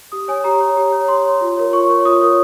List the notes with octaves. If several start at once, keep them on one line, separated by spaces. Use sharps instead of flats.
G4 D#6
C#5 G#5
G4 A#5
C#5
G4
C#5
G4 C6
C#5
F4
A#4 C#5
F4 C#6
A#4 C#5
F4 D#6
A#4 C#5